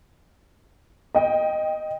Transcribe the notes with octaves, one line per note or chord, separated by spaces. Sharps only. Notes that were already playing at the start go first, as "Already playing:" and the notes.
D#5 G5